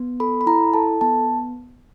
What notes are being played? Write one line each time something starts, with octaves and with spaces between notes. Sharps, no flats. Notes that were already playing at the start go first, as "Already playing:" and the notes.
Already playing: B3
A4 B5
B5
E4 A#5
A4 A5
B3 A5